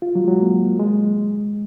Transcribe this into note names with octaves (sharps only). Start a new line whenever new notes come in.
F4
F#3
G#3
F#3
A#3
G#3